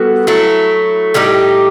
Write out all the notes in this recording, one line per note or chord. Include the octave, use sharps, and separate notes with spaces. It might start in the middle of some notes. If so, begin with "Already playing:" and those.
Already playing: G3 B3 F#4 A4
F#3 A3 E4
A2 G3 D#4 G4